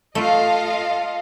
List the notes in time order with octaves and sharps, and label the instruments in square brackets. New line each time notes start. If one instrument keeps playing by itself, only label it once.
[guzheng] A3 [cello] F4 [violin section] A4 D#5 F5